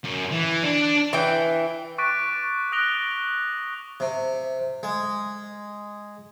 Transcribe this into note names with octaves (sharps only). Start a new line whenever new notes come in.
F#2
E3
D4
E3 G5
C#6 D6 F#6 A6 B6 D7
D#6 F#6 A#6 D7 F7 G7
C3
G#3